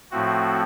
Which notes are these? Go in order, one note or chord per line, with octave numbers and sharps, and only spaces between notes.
A2 F3 A3 C4 F#4